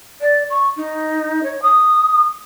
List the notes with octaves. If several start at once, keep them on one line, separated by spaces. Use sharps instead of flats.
D5
C#6
D#4
C#5
D#6